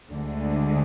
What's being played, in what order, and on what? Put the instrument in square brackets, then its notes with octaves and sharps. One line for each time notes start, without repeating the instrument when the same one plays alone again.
[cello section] D2 D3 G#3